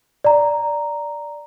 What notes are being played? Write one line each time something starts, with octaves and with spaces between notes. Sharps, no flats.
D5 A#5